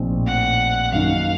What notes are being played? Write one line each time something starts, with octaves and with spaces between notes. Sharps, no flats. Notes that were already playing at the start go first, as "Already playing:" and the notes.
Already playing: A#1 A2 F3 C4 D#4
F#5
F#2 D#3 A#3 D#4 F5